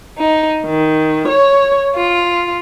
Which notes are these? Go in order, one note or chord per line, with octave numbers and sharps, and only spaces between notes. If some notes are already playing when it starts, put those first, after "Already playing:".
D#4
D#3
C#5
F4